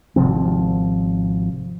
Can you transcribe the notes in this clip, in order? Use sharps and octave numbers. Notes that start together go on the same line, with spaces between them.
G#1 C3 F3 C4